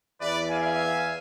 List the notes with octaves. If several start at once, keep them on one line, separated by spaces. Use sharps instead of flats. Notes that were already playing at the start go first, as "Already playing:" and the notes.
E2 E3 B4 D5
E5 F5 G#5